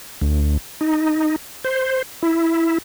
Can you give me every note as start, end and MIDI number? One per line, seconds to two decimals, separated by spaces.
0.21 0.57 38
0.81 1.36 63
1.65 2.02 72
2.23 2.78 64